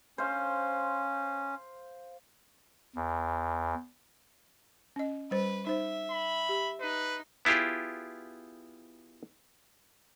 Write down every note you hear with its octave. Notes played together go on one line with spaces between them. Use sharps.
C#4 C5 F5
E2
C#4 D#5
G3 B4 C5
D#4 C5 E5
B5
G4
D#4 B4
B3 E4 F4 G4 G#4